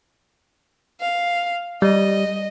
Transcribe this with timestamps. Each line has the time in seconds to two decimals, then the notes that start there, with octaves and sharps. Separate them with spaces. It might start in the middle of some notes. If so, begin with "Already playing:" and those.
1.00 F5
1.82 G3 D#5